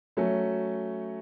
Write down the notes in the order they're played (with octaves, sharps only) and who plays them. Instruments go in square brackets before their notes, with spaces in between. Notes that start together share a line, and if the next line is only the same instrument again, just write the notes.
[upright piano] F#3 A3 C#4